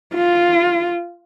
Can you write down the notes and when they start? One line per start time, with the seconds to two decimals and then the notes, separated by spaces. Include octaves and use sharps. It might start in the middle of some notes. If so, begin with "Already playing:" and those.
0.14 F4